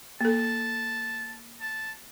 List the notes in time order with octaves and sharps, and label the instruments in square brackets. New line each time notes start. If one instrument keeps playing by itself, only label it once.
[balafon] A#3 A4 [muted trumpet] A5
[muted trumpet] A5